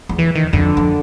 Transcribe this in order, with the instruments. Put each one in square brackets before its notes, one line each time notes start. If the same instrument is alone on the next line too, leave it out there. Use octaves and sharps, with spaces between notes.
[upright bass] E2
[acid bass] E3
D#3
[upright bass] F2 [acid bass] D3
[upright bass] F2